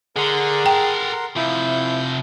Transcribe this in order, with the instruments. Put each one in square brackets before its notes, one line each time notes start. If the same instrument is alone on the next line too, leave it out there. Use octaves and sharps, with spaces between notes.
[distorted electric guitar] D3 [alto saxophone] G#4 [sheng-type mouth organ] A#4 F#5 C6
[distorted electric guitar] A4 A#5 [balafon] G5
[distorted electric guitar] C3 F3 [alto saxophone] E4 [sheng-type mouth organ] G6